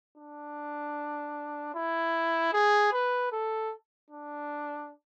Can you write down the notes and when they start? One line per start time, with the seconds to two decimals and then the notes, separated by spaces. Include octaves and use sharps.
0.18 D4
1.75 E4
2.53 G#4
2.93 B4
3.32 A4
4.11 D4